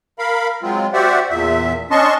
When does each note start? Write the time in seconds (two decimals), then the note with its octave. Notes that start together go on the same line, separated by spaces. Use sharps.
0.19 A#4 F5 B5
0.63 F#3 G#3 C4 F4
0.93 F#4 G4 C5 D5 E5 F#5
1.30 E2 A#2 E5
1.91 C#4 D4 D#5 A5 C6 C#6